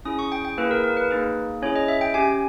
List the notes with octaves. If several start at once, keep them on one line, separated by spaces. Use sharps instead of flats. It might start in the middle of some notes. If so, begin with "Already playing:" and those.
C#4 E4 G#4 D#6
C#6
G5
G5
A#3 E4 G#4 B4
A#4
A#4
B4
A#3 D#4 G#4
C#4 E4 G#4 C#5
D#5
E5
G5
C#4 G4 G#5